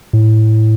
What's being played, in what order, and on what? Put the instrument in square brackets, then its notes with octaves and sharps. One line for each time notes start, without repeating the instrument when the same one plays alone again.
[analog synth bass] A2